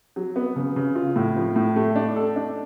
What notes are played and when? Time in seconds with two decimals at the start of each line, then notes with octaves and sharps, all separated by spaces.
0.16 F#3
0.36 B3
0.56 C#3
0.76 C#3
0.95 F4
1.16 A2
1.36 F3
1.56 A2
1.76 A3
1.96 D4
2.16 A4
2.36 D4